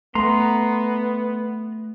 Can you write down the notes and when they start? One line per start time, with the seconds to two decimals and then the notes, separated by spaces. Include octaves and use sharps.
0.15 A3 B3 A#5 C6